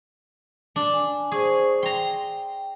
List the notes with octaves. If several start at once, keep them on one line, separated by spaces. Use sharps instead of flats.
D4 D5
G#5
G#4 C5 C#6
G5 A#5 C6